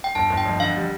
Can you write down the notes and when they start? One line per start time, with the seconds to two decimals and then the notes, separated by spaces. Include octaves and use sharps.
0.04 G5
0.15 G1 A5
0.30 G1
0.38 G5
0.46 F2
0.60 D3 F5
0.76 G3